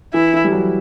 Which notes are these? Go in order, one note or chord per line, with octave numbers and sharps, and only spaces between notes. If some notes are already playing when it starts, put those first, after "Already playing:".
E3 E4
E3
G3
F#3